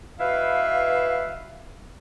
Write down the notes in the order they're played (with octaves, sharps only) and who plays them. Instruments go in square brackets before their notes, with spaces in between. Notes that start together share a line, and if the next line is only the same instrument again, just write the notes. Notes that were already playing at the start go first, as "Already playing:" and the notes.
[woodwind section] B2 E4 B4 E5 F5